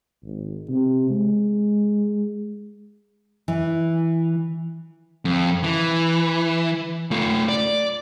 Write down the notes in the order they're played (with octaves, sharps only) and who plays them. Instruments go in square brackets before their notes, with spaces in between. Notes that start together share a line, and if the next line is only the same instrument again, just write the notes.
[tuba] G#1
C3
G#3
[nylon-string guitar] E3
[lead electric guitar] F2
E3
A3 F4
D5